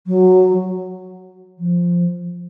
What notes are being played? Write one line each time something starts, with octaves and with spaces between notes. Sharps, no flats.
F#3
F3